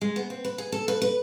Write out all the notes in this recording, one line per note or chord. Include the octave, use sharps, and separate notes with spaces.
G#3
B3
C4
B4
G#4
A4
B4
B4